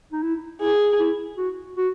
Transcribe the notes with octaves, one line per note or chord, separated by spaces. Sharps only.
D#4
E4
E4 G#4
E4
F#4
F#4